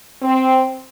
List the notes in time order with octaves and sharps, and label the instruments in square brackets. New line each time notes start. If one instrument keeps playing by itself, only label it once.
[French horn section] C4